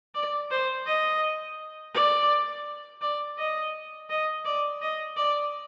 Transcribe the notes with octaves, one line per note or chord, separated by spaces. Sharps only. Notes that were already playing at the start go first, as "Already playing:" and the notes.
D5
C5
D#5
D5
D5
D#5
D#5
D5
D#5
D5